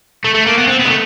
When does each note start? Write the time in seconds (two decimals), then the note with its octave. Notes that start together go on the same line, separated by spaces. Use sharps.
0.25 A3
0.35 A3
0.47 A#3
0.58 B3
0.68 C4
0.79 B3
0.85 G#3
0.89 A3